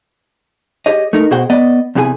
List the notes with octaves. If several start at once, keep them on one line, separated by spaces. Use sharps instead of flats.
G4 G#4 C#5 D#5
A3 D#4 A#4
B2 F#4 G#4 C5 F#5 G5
B3 D5 D#5
E2 C3 E3 G4 G#4 G#5